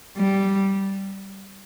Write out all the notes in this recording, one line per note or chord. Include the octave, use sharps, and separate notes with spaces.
G3